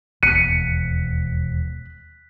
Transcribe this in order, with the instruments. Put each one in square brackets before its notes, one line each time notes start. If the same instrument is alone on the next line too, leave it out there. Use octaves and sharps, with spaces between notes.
[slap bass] E1 [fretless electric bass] D#2 B3 [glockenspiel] F#6 B6 [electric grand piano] C#7 D#7